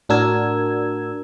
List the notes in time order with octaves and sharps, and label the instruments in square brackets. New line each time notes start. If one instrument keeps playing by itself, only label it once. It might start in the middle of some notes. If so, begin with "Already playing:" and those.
[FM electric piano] A2 D4 F#4 A#4 E6 G#6